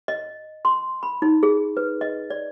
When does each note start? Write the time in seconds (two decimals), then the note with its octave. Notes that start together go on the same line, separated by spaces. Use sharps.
0.08 D#5
0.65 C6
1.03 B5
1.22 D#4
1.43 G#4
1.77 B4
2.01 D#5
2.30 D5